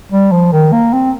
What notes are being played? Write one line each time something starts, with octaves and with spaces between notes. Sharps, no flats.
G3
F3
D#3
A#3
C4